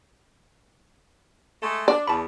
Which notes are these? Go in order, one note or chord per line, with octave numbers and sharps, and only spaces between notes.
G#3 A3
D4 D5
E2 A5 B5